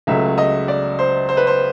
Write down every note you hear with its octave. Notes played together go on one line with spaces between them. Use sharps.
C#2 C#3 F#3 A3 E5
D#5
D5
C5
C5
B4
C5